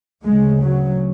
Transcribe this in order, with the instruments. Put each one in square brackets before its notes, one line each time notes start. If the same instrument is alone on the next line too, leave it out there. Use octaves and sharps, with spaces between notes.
[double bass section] D2 C#3 G#3
F#3